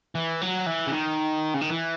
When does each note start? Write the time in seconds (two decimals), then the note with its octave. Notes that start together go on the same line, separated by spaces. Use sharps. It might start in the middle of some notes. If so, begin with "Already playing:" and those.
0.15 E3
0.41 F#3
0.66 E3
0.87 C#3
0.93 D#3
1.54 C#3
1.61 D#3
1.70 E3